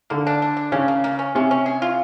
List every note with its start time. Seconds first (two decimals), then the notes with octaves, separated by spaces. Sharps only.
0.10 D3 A#3
0.27 D4
0.42 D4
0.57 D4
0.72 C#3 C#4
0.88 A#3
1.04 A#3
1.19 C#4
1.35 C3 C#4
1.51 C#4
1.66 G#4
1.82 F4